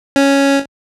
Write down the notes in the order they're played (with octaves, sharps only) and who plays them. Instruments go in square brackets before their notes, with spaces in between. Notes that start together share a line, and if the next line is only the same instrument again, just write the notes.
[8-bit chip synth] C#4